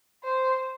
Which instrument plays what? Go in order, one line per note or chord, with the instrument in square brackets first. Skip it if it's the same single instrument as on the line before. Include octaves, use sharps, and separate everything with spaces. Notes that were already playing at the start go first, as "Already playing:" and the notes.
[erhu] C5